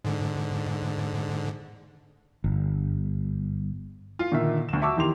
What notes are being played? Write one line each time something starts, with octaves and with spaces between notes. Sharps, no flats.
G#2 D3
G1
F4
A#2 D3 D#3 A#3 E5
D2 E7
F#4 E5 A5 C#6 D6 E6
E2 D#3 G4 C6 F7